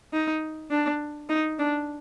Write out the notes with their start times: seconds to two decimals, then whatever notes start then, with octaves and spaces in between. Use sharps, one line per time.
0.13 D#4
0.71 D4
1.30 D#4
1.59 D4